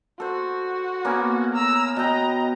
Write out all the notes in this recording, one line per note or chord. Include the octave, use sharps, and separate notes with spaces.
F#4 A4 C5
A#3 B3 C#4
A#5 E6
B2 D#5 G5 A#5